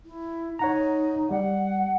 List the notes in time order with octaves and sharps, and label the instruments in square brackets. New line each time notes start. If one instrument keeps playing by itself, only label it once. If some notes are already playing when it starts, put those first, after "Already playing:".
[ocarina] E4
[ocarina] D#4 [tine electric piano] C#5 F#5 A#5
[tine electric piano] G3 [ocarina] F#5